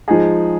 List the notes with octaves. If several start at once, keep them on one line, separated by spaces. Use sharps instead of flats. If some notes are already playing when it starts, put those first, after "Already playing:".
F3 G#3 D#4 G#4